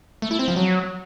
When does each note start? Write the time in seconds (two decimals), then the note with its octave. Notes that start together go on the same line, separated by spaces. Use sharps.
0.22 A3
0.31 E4
0.39 C4
0.48 F3
0.56 F#3